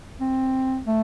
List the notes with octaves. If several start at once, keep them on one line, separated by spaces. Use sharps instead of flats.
C4
A3